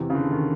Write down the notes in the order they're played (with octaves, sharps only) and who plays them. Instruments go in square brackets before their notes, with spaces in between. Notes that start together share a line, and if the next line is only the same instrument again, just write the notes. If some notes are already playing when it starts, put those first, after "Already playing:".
Already playing: [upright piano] E2 C3 E3
[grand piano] C#3
D3
D#3